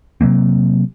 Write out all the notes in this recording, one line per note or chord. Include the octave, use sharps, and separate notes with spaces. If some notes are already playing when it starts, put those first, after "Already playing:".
C3 F#3 A#3 C4